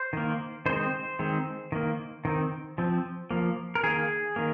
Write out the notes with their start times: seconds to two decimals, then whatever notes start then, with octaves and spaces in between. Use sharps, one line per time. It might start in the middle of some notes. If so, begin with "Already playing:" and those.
Already playing: C5
0.13 D#3 A#3
0.66 D#3 G#3 C4 C5
1.19 D#3 G#3 C4
1.72 D#3 A#3
2.25 D#3 C4
2.78 F3 C4
3.31 F3 A#3
3.75 A#4
3.83 D#3 A#3 G#4
4.36 D#3 A#3